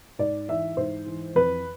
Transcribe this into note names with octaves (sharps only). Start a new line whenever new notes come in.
G#2 D5
E3 E5
G#2 C5
E3
F2 B4